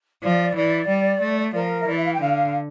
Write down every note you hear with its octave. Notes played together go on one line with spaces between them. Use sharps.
F3 D5
E3 D5
G3
A3
F3 A#4
E5
E3 D5
E5
F5
G5
D3 F5